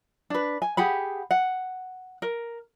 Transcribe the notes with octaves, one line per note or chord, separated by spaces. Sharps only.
D4 B4
G#5
G4 G#4 F#5 B5
F#5
A#4